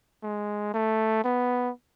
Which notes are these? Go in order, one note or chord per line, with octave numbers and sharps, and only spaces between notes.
G#3
A3
B3